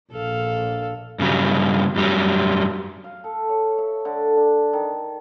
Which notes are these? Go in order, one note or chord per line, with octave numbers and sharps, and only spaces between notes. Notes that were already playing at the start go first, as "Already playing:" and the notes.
A#1 A4 F5
G2 C#3 F#3 G3
F#2 F#3 G3
F5
A4
C#5
E5
D3
D4
D#3